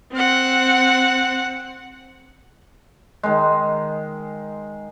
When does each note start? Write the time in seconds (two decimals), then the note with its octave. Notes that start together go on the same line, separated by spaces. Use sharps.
0.13 C4 F#5
3.23 D#3 G#3